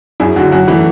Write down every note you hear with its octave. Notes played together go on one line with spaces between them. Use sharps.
F#2 E4 G#4
D3 F#3 F#4
F#2 F#4
E3 A3 E4